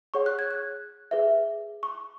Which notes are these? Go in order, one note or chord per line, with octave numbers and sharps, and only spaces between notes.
G#4 C#5 F#5 C#6
F#6
G#6
F#6
G#4 B4 E5
C#6